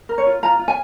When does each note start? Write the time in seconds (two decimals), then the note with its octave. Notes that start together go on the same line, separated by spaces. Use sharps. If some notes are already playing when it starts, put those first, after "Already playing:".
0.09 A#4
0.18 C#5
0.26 F4
0.43 F4 A#5
0.59 F4
0.68 G#5